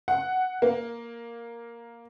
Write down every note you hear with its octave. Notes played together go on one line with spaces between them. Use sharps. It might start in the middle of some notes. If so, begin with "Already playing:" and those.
F#5
A#3